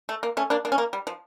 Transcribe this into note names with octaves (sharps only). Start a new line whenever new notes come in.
A3
A#3
A3 C#4
A#3 D4
A#3 D4
C#4
A#3
G3
F3